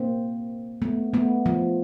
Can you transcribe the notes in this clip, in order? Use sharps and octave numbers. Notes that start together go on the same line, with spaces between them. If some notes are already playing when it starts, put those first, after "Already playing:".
Already playing: A#3 C4
A3 B3
A3 B3
F3